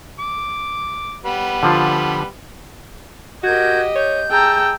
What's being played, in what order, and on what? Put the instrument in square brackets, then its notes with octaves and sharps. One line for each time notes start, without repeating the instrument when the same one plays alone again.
[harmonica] D6
G3 B3 B4
[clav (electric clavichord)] D3 F3 F4
[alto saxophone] F#4 [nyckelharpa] G4 D#5 [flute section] A#4 G6 G#6
[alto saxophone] C#5 [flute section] G6
[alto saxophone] G#4 [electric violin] G5 E6 [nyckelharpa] A5 A#5